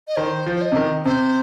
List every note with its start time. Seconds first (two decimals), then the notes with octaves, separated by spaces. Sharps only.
0.08 D#5
0.17 D#3 C5
0.46 F3
0.56 C5
0.62 D#5
0.72 C3
0.76 D#3
1.05 C3 C5